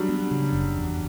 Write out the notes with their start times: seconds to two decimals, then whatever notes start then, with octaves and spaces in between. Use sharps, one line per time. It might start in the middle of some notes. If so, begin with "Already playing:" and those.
Already playing: F#3 G3 D4
0.09 B3
0.31 C#3
0.53 F#1
0.76 E2